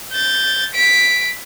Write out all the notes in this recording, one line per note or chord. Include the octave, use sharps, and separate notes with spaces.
G6 A6
B6 D7